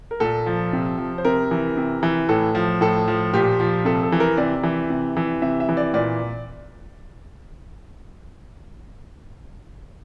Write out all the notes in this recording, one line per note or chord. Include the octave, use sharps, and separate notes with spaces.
A#4
A#2 A4
F3
C3
F3
C5
C3 A#4
E3
C3
E3
A2 A4
F3
A2 A4
F3
A#2 G4
F3
C3 A4
A4
E3
A#4
C3 D5
E3
C3
E3
C3 E5
E5
E3
D5
A#2 D5